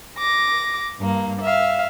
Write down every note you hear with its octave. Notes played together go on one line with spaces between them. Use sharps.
D6 A#6
G2 A#3
E5 F5